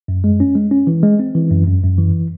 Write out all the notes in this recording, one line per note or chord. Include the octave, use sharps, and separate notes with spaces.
F#2
G#3
C#4
G#3
C#4
E3
G#3
C4
E3
F#2
F#2
F#2
E3